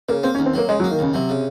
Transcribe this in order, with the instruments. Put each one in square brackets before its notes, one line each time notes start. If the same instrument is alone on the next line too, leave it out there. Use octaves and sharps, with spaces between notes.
[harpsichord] C#3 [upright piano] A#3
[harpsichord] A#3 [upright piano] C4
[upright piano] C#4
[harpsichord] D#2
[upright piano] C4
[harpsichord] F#3 [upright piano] A#3
[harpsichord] C#3 [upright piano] G#3
[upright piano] F#3
[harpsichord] A#3
[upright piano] D#3
[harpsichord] D#2 [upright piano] C#3
[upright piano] C3 [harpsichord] F#3
[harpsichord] C#3